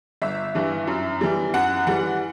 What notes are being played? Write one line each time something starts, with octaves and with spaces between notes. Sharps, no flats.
G1 E5
G2 E3
F#2
E3 G3
F#2 F#5
E3 G3 F#5